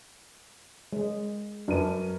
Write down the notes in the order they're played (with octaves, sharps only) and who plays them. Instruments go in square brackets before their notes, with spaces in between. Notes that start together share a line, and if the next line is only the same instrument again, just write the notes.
[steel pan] G#3
[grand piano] F#2 B4 D#7 [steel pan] D4